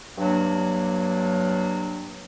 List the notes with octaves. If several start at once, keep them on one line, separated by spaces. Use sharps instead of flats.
G2 F#3 A#3 D4